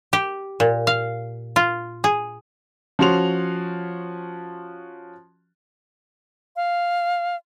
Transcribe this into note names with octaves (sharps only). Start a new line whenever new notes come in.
G4
A#2
F5
F4
G#4
F3 C#4 F#4 C6 F7
F5